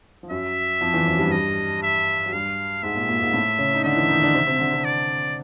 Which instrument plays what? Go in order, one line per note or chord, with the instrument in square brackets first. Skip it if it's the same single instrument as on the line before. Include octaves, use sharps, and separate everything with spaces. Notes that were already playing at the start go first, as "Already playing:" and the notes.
[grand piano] F3
[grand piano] F#2 F#3 [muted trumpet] E5
[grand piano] F2 F3
E2 E3
F#2 F#3
G2 G3
[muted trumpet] D#5
E5
[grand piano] F#3
[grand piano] G2 G3 [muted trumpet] F5
[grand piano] G#2 G#3 [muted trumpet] E5
[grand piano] A#2 A#3
A#2 A#3
G#2 G#3
A2 A3
C#3 C#4
D#4
[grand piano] D3 D4 [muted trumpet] E5
[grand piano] E3 E4
D#3 D#4
D3 D4
C3 C4
C3 C4
D3 D4
C3 C4
[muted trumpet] D5